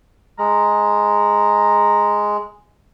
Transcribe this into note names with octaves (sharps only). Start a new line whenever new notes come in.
G#3 A#5